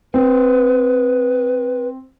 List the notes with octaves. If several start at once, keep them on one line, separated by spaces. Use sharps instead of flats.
C4 B4